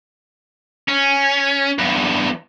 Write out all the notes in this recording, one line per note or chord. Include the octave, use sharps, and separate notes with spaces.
C#4
E2 G2